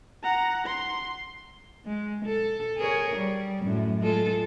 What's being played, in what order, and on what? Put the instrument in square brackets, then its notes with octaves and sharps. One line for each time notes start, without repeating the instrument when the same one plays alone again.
[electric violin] F#5 A#5
C6
[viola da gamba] G#3
A4
G#4 A#4 C#5
G3
F#2 A2 F#3
G#3 F4 A4